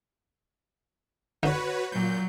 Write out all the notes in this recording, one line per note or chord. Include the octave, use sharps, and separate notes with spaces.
D3 D#4 F#4 B4 C#5
A#2 F#3 G6